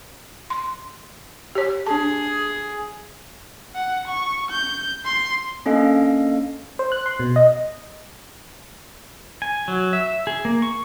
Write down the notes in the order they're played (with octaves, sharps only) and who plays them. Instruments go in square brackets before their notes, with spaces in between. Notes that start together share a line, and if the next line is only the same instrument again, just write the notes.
[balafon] C6
G4 C#5
[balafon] D4 A5 [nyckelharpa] G#4
[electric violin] F#5
C#6
G6
C6
[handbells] A#3 C#4 D4 A4 D#5 F5
[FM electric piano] C5
F#6
C6
B2
D#5
[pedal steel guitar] G#5
F#3
E5
G#4
A#3
C#6